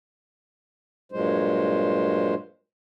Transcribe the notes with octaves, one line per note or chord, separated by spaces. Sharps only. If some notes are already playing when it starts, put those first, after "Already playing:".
G2 A#2 F#3 G#3 C5